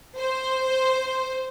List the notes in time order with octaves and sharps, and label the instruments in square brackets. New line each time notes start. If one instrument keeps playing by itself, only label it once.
[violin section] C5